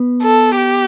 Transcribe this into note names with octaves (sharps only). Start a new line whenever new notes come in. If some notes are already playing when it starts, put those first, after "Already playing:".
Already playing: B3
A4
G4